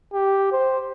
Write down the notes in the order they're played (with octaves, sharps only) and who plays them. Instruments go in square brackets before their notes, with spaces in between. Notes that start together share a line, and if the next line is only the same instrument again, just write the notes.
[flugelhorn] G4
C5